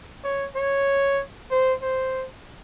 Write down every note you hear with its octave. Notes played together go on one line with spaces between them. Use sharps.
C#5
C#5
C5
C5